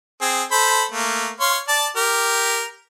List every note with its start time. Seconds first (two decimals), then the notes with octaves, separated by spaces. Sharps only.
0.22 C4 G#4
0.52 A4 C5 B5
0.92 A3 A#3
1.40 C#5 F5 C6
1.68 D5 A5
1.97 G4 A#4